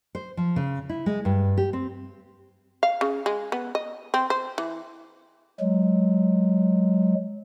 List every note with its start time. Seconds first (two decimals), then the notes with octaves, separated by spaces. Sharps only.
0.15 C5
0.37 F3
0.56 C#3
0.89 E4
1.06 G#3
1.25 G2
1.57 G4
1.73 C4
2.83 F5
3.01 C#3
3.26 G#3
3.52 B3
3.75 D#5
4.14 C4
4.30 C5
4.58 E3
5.60 F#3 G#3